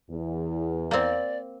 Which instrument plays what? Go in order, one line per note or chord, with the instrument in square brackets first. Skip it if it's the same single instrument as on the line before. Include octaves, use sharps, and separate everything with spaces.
[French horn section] E2
[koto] A#3 C4 [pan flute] D5